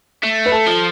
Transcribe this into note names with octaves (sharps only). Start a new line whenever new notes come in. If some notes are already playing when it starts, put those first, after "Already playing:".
A3
B4
A4
F3